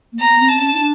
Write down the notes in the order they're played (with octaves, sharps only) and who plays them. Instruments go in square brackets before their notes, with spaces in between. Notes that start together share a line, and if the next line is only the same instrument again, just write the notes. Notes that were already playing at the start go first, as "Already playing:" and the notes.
[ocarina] A#3
[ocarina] B3 [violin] A#5
[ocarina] C4
[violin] A5
[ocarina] C4
C#4
D#4
D4